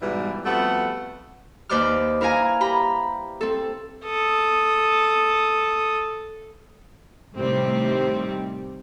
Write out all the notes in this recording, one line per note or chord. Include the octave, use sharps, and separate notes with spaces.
G#2 B2 E3 G3
F2 G3 A3 B3 F#4 F#5
D#2 B4 C5 D5 D6 F6
E4 A#4 F5 G#5 A#5
G4 A#5 B5
C4 A4
A4 D#6
A2 C3 D#3 G3 C4